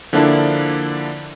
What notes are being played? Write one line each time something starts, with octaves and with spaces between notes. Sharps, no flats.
D3 F3 A#3 D4 E4 A4